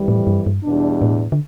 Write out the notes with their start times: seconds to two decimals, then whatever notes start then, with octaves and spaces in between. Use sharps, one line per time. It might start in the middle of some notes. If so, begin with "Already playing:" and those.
Already playing: F2 E3 G3
0.08 A2
0.27 G2
0.47 G2
0.64 E2 B2 G3 D4
1.02 A2
1.32 D3